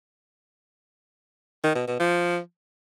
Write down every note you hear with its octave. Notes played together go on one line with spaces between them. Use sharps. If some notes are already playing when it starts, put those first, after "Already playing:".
D#3
B2
B2
F3